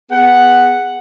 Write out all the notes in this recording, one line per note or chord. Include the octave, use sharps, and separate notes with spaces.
B3 G#4 F#5